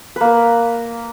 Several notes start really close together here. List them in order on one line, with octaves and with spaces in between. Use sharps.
B4 A#3 A#4